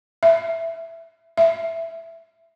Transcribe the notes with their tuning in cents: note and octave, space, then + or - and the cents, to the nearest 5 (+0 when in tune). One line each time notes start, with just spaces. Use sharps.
E5 +5
E5 +5